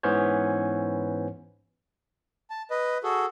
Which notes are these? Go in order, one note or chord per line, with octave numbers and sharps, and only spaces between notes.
G#2 E3 B3 C#4 C5 C#5
A5
B4 D#5
F#4 G#4 A4